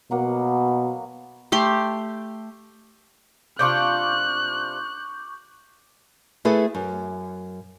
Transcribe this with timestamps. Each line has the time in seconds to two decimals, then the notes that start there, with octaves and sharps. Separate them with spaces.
0.11 B2 F#3 A#3 F#5
1.52 A3 G4 C6
3.59 C3 D4 F4 C#6 D6 F#6 G6
6.45 A3 E4 G#4 A4 B4
6.75 F#2